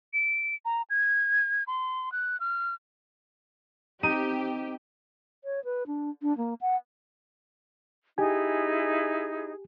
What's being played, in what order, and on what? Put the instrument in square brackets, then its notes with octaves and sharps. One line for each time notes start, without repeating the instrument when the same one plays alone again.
[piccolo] D7
A#5
G#6
C6
F#6
F6
[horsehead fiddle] C4 [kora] D#4 [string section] G4 [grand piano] D#7
[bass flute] C#5
B4
D4
D4
A#3
F#5
[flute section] D#4 E4 G#4 [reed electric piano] G4 G#5